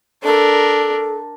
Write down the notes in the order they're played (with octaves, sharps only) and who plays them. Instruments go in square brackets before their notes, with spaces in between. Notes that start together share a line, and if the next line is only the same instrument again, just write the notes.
[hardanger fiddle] D4 A#4 [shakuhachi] A4